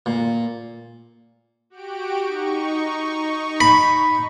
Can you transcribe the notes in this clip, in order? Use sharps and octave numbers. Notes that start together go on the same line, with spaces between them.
A#2
F#4 G4 D7
D#4 C#6
B5